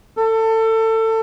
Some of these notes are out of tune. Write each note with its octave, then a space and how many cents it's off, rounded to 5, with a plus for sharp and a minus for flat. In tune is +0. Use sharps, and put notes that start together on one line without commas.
A4 +25